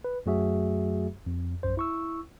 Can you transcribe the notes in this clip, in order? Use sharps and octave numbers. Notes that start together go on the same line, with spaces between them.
B4
F#2 F#3 A3 F#4 G#4 E5
F2
A#1 F#2 C5
E4 C#6 E6